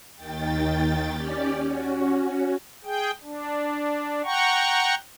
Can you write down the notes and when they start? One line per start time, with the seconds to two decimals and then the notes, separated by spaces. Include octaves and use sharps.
0.16 D#2 D#3 G5 A6
1.12 C#4 G4 D5
1.62 C#4 F#4
2.85 G#4 G5
3.23 D4
4.24 F#5 G5 A#5 C#6